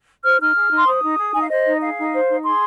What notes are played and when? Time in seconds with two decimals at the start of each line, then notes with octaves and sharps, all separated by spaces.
0.24 C5 F6
0.40 D#4 F6
0.56 G#4
0.72 D#4 C6
0.87 C5 D#6
1.03 D#4
1.19 G#4
1.32 D#4 G#5
1.41 F5
1.50 C5 D#5
1.67 D#4
1.82 G#4 F5
1.98 D#4
2.13 C5
2.28 D#4
2.44 G#4 C6